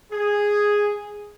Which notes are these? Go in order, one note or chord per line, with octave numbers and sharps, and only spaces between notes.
G#4